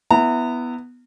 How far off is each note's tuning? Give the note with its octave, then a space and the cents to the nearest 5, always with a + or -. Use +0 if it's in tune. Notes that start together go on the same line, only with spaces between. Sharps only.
B3 +0 E4 +0 A#5 -35